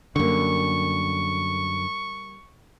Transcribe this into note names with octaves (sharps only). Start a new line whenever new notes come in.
F#2 D3 G3 A#3 C#6